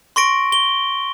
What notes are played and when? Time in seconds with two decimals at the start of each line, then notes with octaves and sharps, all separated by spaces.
0.16 C6 C#6 A#6 D7
0.52 G7